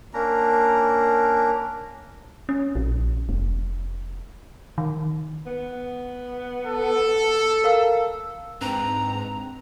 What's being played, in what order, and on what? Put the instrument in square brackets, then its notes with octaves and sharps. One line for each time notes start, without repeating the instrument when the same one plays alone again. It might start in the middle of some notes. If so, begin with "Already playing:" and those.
[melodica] A#3 C#4 D4 A#5
[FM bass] C#4
A#1
F1
D#3
[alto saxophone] B3
[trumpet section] A4
[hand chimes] A#4 F5 E6
[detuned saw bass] G#2 [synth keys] C4 D4 B4 [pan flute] A#5